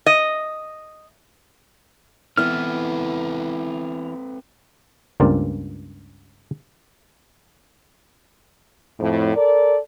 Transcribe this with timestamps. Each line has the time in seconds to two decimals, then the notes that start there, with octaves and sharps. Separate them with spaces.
0.06 D#5
2.37 E3 B3 C4 E4 A4 B4 F6
5.20 C#2 G2 A#3 C4 F4 D5
8.99 F2 A2
9.35 A4 A#4 D5